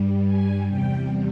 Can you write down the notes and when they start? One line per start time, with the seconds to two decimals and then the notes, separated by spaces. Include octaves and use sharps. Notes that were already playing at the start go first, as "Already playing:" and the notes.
Already playing: G2 G3
0.25 G#5
0.68 E2 C3 G3 G5